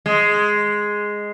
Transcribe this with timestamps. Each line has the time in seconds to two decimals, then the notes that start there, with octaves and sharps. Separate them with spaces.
0.06 G#3